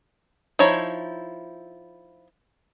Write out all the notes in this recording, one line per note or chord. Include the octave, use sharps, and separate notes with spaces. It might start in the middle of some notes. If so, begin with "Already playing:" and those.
F3 D#4 E4 C#5